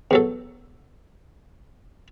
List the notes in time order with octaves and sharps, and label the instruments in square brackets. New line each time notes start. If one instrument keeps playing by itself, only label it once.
[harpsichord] E2 F#3 A4